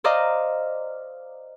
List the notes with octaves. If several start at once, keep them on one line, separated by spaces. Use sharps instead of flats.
C5 D5 D#5 F5 A#5